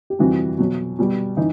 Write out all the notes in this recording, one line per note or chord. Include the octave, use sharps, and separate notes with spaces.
G4
F2 C3 E3 G3 F#4
B2 F#3
B2 G3
E3 D#4